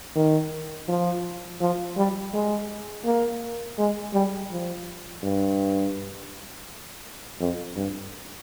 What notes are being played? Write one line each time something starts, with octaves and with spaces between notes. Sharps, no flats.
D#3
F3
F3
G3
G#3
A#3
G#3
G3
F3
G2
F2
G2